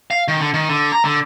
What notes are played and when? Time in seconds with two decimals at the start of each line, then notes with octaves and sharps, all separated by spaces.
0.10 F5
0.28 D#3
0.40 D3
0.54 D#3
0.69 D3
0.92 A#5
1.05 D3